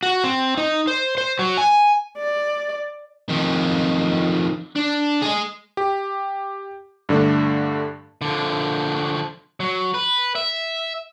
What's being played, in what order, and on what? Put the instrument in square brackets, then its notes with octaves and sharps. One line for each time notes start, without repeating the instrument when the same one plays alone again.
[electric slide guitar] F#4
C4
D#4
C5
C5
F#3
G#5
[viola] D5
[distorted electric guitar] F2 D#3
D4
G#4 D#5
[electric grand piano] G4
G2 D3 A3 D4
[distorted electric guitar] D3 F3
F#3
B4
E5